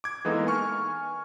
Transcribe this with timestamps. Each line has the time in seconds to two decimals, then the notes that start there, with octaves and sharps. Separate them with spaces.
0.04 D6 G#6
0.25 E3 G#3 A#3 B3 D#4 A4
0.47 G#5 C#6 F6